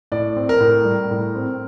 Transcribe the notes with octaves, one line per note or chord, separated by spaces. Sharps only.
A2 D5
C4
A#4
A2
G3
A2
C4